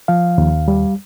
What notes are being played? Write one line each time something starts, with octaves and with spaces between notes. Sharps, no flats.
F3 F5
D#2
G3